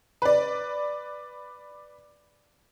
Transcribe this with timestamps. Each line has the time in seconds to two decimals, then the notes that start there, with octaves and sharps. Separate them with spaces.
0.22 B4 D5